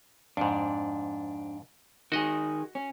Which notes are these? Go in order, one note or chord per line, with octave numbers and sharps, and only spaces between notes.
F2 G#2 D4
D#3 F#4 G#4 D#5
C#4